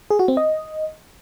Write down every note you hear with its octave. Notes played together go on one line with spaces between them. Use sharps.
G#4
F#4
C4
D#5